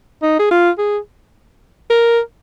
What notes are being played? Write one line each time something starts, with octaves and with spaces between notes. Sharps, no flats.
D#4
G#4
F4
G#4
A#4